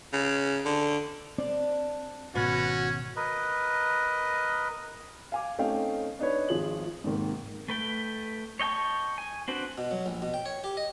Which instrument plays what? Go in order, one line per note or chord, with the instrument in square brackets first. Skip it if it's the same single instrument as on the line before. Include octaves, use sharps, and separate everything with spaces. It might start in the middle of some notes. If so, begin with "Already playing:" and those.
[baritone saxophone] C#3
D3
[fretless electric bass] C4 [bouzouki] D4
[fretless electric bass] G#1 B2 [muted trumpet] C#4 [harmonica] F#4 [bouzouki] B4
[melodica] A#4 B4 D#5
[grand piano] F5 G#5 D6
A3 C4 C#4 D#4 F5 G5
D4 D#4 B4 C#5
G#1 F3 G#4 F#7
G#2 C3 D#3 A#3
[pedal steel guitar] A3 B4 G5
C#5 D#5 G5 A5 C#6
G#5
C4 D4 F#4 B4 C5
[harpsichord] B2
F#3
A#1
B2
G5
C#5
G4
D#5